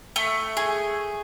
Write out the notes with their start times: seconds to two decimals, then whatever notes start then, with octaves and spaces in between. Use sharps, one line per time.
0.16 A3
0.57 G#4